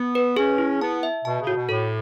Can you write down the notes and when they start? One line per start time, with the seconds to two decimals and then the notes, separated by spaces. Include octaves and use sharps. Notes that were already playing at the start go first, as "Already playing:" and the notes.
Already playing: B3
0.15 B4
0.36 C#4 G#4
0.58 E4
0.80 B3 A5
1.03 E5
1.24 B2 A5
1.40 C#3
1.47 A2 F#4
1.54 B2
1.69 A2 A4